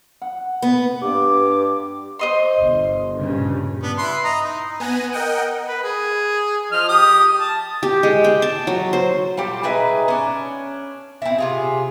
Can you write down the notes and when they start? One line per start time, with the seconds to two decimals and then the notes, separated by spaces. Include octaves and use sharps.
0.22 F#5
0.62 B3
1.02 G2 D6
2.19 C5 D#5 C6
2.58 G1
3.16 G2 A#2 C#3
3.83 B3 D4
3.98 E4 B4 C6
4.24 D#5 A#5
4.44 D#4
4.80 B3 G#5 F#6 A#6 D#7
5.13 A#4 D#5 F#5 G5
5.66 B4
5.83 G#4
6.72 F3 D#5 F6
6.88 G4 D#6
7.39 A5
7.83 G4
8.03 G#3
8.24 G5
8.42 A5
8.67 F#3
8.93 C5
9.37 G3 A3 F4 G4
9.63 D#4 G#4 B4 E5
10.08 C#4 D4
11.22 C4 E4
11.38 C3 F4 G#4